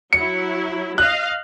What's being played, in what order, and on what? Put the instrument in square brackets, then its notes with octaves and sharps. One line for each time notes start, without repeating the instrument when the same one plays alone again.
[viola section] F#3 E4 [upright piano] C#7
[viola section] D#5 F5 [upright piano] F#6